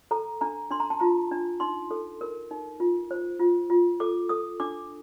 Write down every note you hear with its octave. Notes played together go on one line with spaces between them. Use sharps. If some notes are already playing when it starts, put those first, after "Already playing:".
A4 A#5
D4 A#5
D4 C6
A#5
A5
F4 A#5
D4
D#4 C6
A4
A#4
D#4
F4
C5
F4
F4
A4 D6
A4 D#6
D4 D6